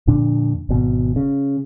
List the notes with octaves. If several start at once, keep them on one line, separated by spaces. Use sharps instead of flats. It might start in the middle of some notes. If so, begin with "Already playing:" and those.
F2 A#2 D3 D4
G#1 B2
C#3